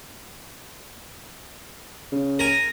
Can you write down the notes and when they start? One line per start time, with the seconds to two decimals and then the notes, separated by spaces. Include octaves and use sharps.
2.12 C#3
2.39 A#4 G#5